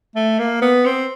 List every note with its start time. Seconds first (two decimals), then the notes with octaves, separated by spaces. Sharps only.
0.15 A3
0.39 A#3
0.62 B3
0.86 C4